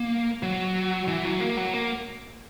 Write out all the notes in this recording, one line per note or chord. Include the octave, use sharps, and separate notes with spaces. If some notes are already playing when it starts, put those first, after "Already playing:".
Already playing: A#3
F#3
E3
F#3
A#3
F#3
A#3